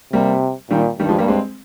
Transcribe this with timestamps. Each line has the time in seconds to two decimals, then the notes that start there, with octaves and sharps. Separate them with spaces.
0.13 C3 G3 A#3
0.70 A#2 D#3 G3
0.99 G2 D#3 G3
1.09 F3 G#3
1.18 G3 A#3
1.28 G#3 C4